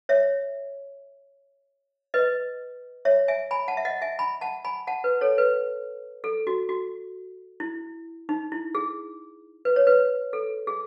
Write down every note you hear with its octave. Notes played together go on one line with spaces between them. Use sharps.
C#5 E5
B4 D#5
C#5 E5
E5 G#5
G#5 B5
F#5 A5
E5
D#5 F#5
E5 G#5
G#5 B5
F#5 A5
G#5 B5
F#5 A5
B4
A4 C#5
B4
A4
F#4
F#4
E4
D#4
E4
G#4
B4
C#5
B4
A4
G#4